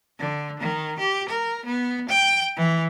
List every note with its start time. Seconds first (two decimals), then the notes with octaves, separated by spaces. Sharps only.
0.19 D3
0.59 D#3
0.99 G4
1.29 A#4
1.65 B3
2.09 G5
2.56 E3